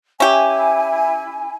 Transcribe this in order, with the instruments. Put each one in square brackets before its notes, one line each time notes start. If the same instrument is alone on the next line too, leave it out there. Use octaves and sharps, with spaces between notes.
[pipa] C#4 G4 [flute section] E4 G#5 [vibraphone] E5